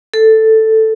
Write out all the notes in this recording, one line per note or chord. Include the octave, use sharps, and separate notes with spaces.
A4